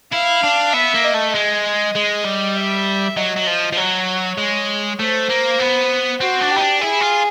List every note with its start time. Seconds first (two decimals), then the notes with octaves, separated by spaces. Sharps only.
0.13 E4 F5
0.44 D4
0.74 B3 E5
0.95 A#3
1.04 D#5
1.14 A3
1.34 G#3 D#5
1.96 G#3
2.25 G3
2.56 E5
3.17 F#3 D#5
3.36 F#3
3.47 F3
3.73 F3
3.77 F#3 C#5
4.38 G#3
5.00 A3 C5
5.30 A#3
5.60 B3
6.20 C4 F#4
6.41 D4
6.51 G4
6.56 D#4
6.61 D4
6.81 E4 G#4
7.01 F4